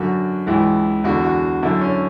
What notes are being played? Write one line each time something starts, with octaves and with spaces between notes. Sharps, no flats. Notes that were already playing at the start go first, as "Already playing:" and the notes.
Already playing: F#2 D3 F#4
C#2 C#3 E3
E2 D3 F#4
F#4
F#2 D3 E4
C#4